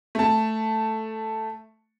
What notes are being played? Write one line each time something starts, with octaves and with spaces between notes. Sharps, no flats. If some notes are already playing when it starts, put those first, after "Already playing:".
A3 A5